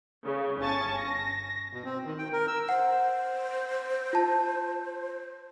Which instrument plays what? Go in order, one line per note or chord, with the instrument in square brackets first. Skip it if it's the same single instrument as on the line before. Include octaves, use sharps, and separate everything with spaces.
[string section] C#3
G1 C#4 G#5 A5 C#6 A6
A#6
[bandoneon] B2
C4
D#3
G5
A#4
E6
[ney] C5 [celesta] F#5
[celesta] F4 A5